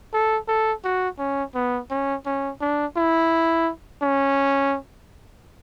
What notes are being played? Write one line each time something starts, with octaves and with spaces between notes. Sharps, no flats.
A4
A4
F#4
C#4
B3
C#4
C#4
D4
E4
C#4